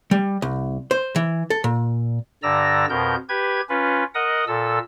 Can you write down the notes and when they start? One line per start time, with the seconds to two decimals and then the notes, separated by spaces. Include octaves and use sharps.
0.11 G3
0.42 C2
0.91 C5
1.16 E3
1.50 A4
1.64 A#2
2.43 G2 D3 D5 A#5 E6 A#6
2.89 F2 B2 A#4 G6
3.29 G4 B4 G#6
3.69 C#4 F4 B4
4.15 A#4 D#5 F#5 D#6
4.47 A#2 A4 E6